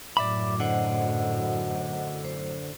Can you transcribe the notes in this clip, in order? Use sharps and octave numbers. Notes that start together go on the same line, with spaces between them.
F#2 A2 F#3 D5 E5 B5 D6
D3 C5 D#5 F#5
C5